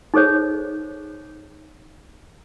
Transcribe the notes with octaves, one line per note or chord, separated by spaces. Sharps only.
D#4 G#4 A4 C5 C#5